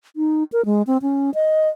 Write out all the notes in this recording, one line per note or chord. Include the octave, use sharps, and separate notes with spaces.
D#4
A#4
G#3
C4
C#4
D#5